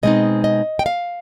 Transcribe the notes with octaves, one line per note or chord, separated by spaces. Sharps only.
B2 G#3 C4 D#4 D#5
D#5
G5
F5